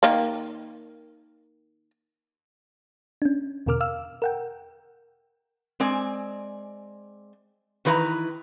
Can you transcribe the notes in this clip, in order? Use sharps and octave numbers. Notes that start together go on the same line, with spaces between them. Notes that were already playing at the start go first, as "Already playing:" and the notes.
D#3 A#3
C#4 D4
E2 B2 D3 A#4 D6 F6
F5 E6 F6
A#4 F#5 G5
G#3 C4 D5 G#5
D#3 E3 B4 D5 A#5